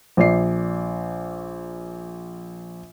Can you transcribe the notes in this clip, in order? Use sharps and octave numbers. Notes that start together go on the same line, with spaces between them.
A#1 D5 C7